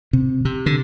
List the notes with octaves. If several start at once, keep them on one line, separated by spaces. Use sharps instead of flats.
C3
C3
D3